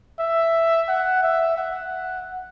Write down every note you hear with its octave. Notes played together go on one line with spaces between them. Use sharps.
E5
F#5
E5
F#5